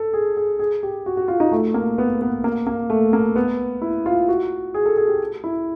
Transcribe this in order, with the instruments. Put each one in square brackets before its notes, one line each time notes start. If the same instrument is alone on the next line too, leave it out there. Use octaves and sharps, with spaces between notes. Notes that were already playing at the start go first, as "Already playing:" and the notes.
Already playing: [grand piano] A4
G#4
G#4
G#4
G4
F#4
F#4
F4
D#4
A3
A#3
B3
B3
A#3
A#3
A3
A#3
B3
E4
F4
F#4
G#4
A4
G#4
G4
E4